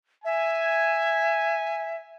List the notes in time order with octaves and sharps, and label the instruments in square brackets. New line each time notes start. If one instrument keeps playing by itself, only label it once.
[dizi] E5 [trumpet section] G#5